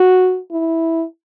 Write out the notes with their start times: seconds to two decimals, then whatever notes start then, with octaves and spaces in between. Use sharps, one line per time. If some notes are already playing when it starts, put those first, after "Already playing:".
Already playing: F#4
0.51 E4